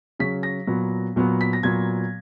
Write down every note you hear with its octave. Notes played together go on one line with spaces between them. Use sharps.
C#3 F#3 C#4 B6
A#6
A#2 F#3 B3
A#2 F#3 B3
B6
A#6
A#2 F#3 B3 G#6